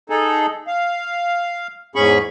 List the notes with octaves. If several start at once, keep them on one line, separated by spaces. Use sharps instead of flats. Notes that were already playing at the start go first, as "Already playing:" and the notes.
D#4 G#4 A4
F5
E2 G#2 C#4 G#4 B5 C#6